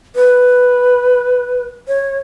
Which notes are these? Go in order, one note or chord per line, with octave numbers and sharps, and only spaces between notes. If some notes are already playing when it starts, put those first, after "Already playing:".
B4
C#5